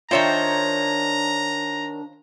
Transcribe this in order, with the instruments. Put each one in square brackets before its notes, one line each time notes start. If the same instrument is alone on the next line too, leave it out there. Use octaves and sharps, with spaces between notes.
[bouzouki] D#3 C#5 G5 [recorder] D4 [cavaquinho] F4 C5 E5 [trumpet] A#5